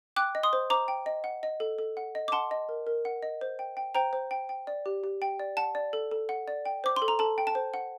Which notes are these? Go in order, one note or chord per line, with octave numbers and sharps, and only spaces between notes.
G5 D6 F#6
D#5
C6 D#6
C5
C5 A#5 D6
G5
D#5
F#5
D#5
A4
A4
F#5
D#5
D6
F#5 A5 C6
D#5
A#4
A#4
F#5
D#5
C5
G5
G5
C5 G5 A#5
C5
G5
G5
D5
G4
G4
G5
D5
F#5 A5
D5
A4
A4
F#5
D5
G5
C5 D6
C6
A4
A#5
A4 A5
G5
A5
C5
F#5